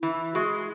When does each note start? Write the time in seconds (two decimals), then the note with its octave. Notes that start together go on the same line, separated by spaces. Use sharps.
0.02 E3 E4
0.34 G#3 F#4